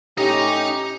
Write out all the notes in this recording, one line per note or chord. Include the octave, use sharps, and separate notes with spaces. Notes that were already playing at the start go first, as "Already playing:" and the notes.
A2 C#4 D#4 G4 D#5